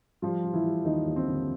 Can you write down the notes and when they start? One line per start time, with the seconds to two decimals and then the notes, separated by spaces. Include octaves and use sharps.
0.22 F3 G3 F4
0.44 G3
0.54 E3 E4
0.64 G3
0.85 D#2 D#3 D#4
1.05 D#2
1.16 C4
1.27 D3